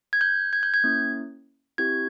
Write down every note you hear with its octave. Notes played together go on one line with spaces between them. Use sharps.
G#6
G6
G#6
G6
G#6
A#3 C#4 E4
C4 E4 G4 G#6